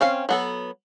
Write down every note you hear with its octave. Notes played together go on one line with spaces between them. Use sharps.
C4 C#4 F5
F#3 B3 A4